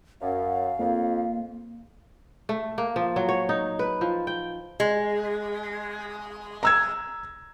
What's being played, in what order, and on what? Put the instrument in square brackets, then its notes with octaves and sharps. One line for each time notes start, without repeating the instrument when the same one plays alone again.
[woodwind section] F#2 [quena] F5
[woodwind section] F2 [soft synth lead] A#3
[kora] A3
A#3
F3
F#3
C#5
D#4
B4
F3
G5
[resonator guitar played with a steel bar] G#3
[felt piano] A#5 E6 G#6